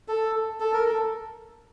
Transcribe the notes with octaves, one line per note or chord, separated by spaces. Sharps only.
A4
A4
A#4
A4